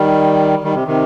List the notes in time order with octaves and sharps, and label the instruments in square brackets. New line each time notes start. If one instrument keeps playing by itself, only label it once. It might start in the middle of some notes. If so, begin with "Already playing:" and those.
Already playing: [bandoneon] D#3 G3
D#3 G3
C3
C3 D#3